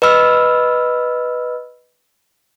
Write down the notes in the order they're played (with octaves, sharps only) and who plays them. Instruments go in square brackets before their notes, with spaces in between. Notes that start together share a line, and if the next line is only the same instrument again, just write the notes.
[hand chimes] B4 D#5 B5 E6 F6